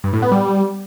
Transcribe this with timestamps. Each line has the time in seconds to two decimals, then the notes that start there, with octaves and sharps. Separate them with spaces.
0.04 G2
0.13 A2
0.22 B3
0.32 G3